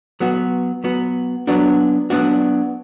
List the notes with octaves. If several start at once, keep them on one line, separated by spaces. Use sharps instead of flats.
F#3 B3 F#4
F#3 B3 F#4
F#3 B3 D4 F#4
F#3 B3 D4 F#4